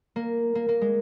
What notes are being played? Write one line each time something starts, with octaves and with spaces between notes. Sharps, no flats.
A#3
A#3
A#3
G#3